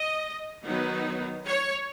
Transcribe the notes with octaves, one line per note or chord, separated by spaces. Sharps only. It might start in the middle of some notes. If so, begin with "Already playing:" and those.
Already playing: D#5
D#3 F#3 B3 D#4
C#5